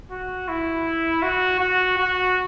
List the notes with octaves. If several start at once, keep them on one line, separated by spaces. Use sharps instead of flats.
F#4
E4
F#4
F#4
F#4